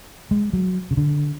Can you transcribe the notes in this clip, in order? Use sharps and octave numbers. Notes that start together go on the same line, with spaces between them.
G#3
F#3
C#3
D3